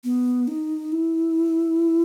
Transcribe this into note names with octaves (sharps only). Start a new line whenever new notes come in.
B3
D#4
E4